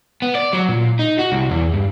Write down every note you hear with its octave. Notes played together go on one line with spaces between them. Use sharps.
B3
D5
F#3
A#2
D#4
F#4
C2
E2
G2